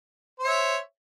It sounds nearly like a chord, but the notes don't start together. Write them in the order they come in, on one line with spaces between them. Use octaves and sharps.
C5 C#5 E5